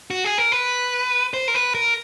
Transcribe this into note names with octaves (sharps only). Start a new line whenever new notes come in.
F#4
G#4
A#4
B4
C5
A#4
B4
A#4